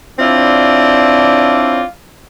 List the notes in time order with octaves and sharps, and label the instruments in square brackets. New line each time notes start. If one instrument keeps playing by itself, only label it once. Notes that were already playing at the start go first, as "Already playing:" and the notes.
[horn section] C4 D4 E4 F4 C#5 D5